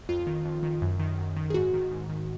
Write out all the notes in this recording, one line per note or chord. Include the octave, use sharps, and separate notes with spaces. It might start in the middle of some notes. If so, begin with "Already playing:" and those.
F2 F4
D#3
F2
D#3
F#2
D#3
F#2
D#3
G#4
G#2 F#4
D#3
G#2
D#3